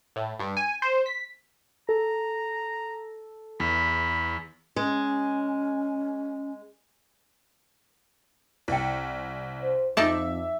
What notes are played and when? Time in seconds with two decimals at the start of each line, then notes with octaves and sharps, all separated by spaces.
0.16 A2
0.40 G2
0.57 G#5
0.82 C5
1.06 B6
1.89 A4 A#5
3.60 E2 B5
4.76 G#3 C#4
8.68 C2 E4 G5
9.61 C5
9.97 F2 D#4 D5 E5 A5 D6